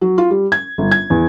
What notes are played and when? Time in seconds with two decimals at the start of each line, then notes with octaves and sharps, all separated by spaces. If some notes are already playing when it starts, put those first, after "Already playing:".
0.01 F#3
0.18 F4
0.30 G3
0.52 G#6
0.78 G1
0.92 G#6
1.10 E2